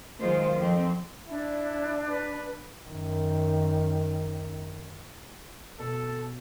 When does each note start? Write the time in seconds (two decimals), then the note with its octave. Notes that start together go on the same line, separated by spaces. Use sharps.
0.20 D#3 F#3 G#3 F4 C5
0.56 F2 F3 C4
1.28 D4 E4
2.09 B4
2.86 F#2 D#3
5.79 B2 A4